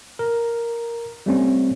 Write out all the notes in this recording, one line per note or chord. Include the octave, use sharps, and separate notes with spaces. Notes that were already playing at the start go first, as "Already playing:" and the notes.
A#4
G3 A3 C4 C#4